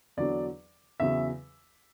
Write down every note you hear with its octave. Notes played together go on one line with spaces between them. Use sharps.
E2 D3 F#3 D5
E2 C#3 F#3 E5